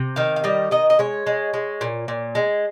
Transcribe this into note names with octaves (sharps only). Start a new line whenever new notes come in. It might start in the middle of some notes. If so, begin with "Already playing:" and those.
Already playing: C3
D#3 F5
F5
G3 D#5
D#3 D#5
D#5
G#3 C#5
G#3
G#3
A#2
A#2
G#3